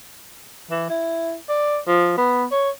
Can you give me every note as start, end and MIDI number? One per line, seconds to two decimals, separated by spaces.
0.71 0.89 52
0.90 1.34 64
1.49 1.78 74
1.87 2.13 53
2.18 2.45 59
2.51 2.70 73